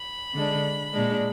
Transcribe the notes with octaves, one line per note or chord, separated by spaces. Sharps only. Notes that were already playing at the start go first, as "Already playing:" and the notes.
Already playing: B5
D3 G#3 D4
A#2 G#3 D4